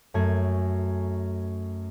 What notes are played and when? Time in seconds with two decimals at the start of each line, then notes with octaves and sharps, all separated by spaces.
0.14 F#2 A3 G#5